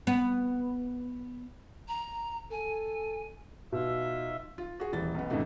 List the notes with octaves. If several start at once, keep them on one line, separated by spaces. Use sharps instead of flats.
B3
A#5
A4 G#5
B2 D#4 F4 E5
F4
F#4 G#4
D#1 E3 A6
B1 B3
F2 A2 C#3 E3 A3 D#4